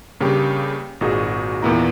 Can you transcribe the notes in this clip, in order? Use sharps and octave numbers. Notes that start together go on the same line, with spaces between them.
G2 C#3 A#3 G4
G#1 A#2 D#4 F#4 G#4
E2 A#2 D#3 B3 E4 A#5